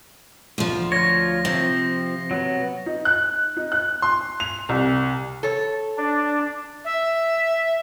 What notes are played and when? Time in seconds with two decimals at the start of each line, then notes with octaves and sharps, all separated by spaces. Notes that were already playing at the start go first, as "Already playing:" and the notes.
0.58 D2 F3
0.92 F4 C#5 A#6
1.45 C3 F3 C4
2.31 F#3 B3
2.86 D#4
3.05 F#6
3.57 D#4
3.72 F#6
4.02 C6
4.40 F7
4.69 C2
5.43 A4 C#5
5.97 D4
6.85 E5